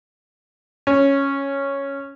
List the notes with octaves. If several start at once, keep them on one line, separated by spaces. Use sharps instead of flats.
C#4